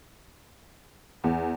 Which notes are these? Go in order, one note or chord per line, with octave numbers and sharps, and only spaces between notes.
E2